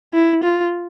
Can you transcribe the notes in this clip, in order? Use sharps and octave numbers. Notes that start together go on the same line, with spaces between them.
E4
F4